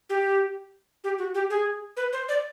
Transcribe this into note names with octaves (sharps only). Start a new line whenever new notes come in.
G4
G4
F#4
G4
G#4
B4
C5
D5